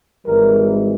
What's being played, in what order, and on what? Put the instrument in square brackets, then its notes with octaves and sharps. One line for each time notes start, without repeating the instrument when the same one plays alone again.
[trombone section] G#1 G#2 E3 G3 A#4